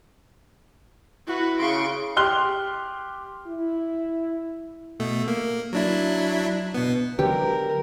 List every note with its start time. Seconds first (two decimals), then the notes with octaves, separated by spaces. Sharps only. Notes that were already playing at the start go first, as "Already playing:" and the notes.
1.27 E4 F#4 B4
1.59 C#3 C6 C#6 D7
2.16 G4 C6 F6 F#6 G7
3.47 E4
5.00 B2 A3
5.28 A#3
5.73 F#3 D4 E4
6.75 B2 B3
7.19 D3 F#3 G#3 G4 A#4 B4